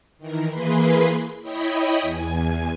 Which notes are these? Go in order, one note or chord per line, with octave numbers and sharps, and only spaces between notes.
D#3 E3 A#4
E3 A#3 G#4 B4 B5 C6
E4 C#5 D#5 G5 B5 D#6
E2 G#5